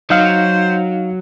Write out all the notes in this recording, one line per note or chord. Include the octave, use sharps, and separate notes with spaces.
F#3 D#4 C5 F5